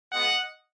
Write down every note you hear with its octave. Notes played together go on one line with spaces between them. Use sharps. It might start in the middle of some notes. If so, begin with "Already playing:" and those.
G#3 B3 F4 D#5 F#5